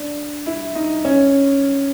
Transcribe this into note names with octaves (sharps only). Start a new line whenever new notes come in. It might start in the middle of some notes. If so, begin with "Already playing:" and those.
Already playing: D4
E4
D#4
C#4